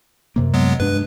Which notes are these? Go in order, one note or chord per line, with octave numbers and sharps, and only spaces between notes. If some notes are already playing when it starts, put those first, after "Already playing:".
F#2 C3 A#3
F#3 G#3 B3
G2 G#3 D4 B4